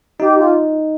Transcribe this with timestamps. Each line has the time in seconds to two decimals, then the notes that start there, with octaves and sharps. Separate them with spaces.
0.20 D#4 G4
0.38 F4